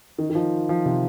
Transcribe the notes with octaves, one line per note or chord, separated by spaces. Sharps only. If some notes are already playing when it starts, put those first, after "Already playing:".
D#3
D#3
F3
F3
C3